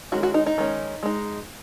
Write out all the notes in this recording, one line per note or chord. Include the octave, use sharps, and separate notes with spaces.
D#3 G#3 C#4 F#4
F#4
D#4
D#4
D#3 G#3 C#4
G#3 D#4